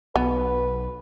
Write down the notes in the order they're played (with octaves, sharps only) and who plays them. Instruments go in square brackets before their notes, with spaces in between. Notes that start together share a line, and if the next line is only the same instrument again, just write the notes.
[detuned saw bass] B1 [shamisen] B3 [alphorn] B4